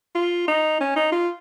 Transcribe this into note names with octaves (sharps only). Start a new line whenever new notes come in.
F4
D#4
C#4
D#4
F4